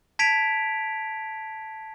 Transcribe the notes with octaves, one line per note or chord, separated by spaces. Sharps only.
A5 G#6 B6 D7 F7